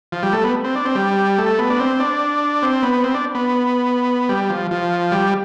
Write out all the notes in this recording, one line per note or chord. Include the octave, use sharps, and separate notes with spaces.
F3
G3
A3
B3
C4
D4
C4
G3
A3
B3
D4
C4
D4
C4
B3
C4
D4
B3
G3
F3
F3
G3